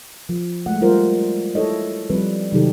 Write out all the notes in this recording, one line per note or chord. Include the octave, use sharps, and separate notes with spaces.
F3
G#3 A3 F#5
G3 F4 A#4 C5
E4 A4 C#5 D#5
F3 G3 C4 B4
C3 D#3 F#3 D#4 G4 A4